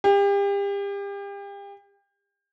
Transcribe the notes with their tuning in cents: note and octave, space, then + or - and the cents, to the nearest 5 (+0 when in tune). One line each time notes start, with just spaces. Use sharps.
G4 +35